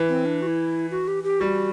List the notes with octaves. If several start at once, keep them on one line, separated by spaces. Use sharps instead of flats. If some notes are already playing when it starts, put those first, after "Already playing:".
Already playing: E3
C4
D4
F#4
E4
F#4
G4
G4
G3 F#4